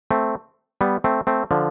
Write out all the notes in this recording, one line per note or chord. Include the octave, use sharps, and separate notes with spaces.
A3 C4
G3 B3
A3 C4
A3 C4
D3 F3